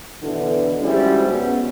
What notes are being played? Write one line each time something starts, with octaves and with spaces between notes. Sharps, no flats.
B2 D3 E3
F3 G3 G#3 C#4 E4 F#4
G2 B2 B3 C#4 F#4